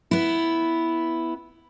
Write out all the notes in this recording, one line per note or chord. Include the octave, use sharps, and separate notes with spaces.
B3 E4